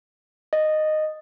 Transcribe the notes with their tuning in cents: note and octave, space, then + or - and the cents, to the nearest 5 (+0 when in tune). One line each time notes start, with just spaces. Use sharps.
D#5 -10